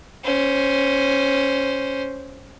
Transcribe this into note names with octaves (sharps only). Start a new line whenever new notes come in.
C#4 C5